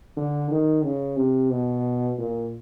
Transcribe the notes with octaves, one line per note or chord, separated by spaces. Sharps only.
D3
D#3
C#3
C3
B2
A#2